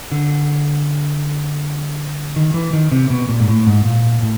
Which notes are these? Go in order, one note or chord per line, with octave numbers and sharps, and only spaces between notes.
D3
D#3
E3
D#3
C3
B2
A#2
G#2
A2
G#2
A#2
A2